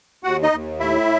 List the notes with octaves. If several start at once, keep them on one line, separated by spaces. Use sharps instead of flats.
D#2 F#4 F#5
D#4 D#5
D#2
A2 E4 E5